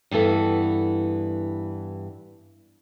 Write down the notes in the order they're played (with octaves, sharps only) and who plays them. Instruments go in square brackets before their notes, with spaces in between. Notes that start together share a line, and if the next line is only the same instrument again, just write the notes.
[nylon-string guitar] G2 E3 B3 A4